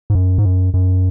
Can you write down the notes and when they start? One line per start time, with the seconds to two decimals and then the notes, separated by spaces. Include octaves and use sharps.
0.10 G#2
0.15 F#2
0.38 G#2
0.45 F#2
0.74 F#2